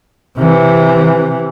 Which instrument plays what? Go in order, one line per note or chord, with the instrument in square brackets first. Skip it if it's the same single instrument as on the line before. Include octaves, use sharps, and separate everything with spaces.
[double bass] C3 E3